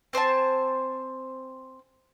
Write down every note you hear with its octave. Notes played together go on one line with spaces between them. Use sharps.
C4 C5 G#5 A5